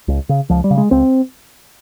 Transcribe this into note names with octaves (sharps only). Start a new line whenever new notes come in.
C#2
C#3
C#2 F3
G3
C#3
G#3
C#2 C4